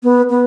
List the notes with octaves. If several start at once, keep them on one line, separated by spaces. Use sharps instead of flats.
B3
B3